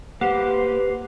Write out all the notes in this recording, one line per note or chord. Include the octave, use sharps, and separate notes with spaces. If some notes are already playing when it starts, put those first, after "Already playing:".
A#3 G4 B4 C5 F#5